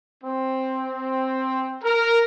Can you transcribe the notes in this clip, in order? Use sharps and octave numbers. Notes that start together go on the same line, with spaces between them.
C4
A#4